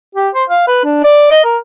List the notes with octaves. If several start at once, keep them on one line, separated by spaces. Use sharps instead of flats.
G4
C5
F5
B4
D4
D5
D#5
A#4